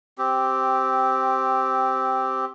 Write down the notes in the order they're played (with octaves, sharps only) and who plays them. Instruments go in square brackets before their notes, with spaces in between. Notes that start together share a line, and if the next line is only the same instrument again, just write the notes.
[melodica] C4 G4